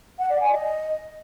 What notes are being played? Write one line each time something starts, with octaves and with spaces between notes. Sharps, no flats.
F#5
D5
G#5
D#5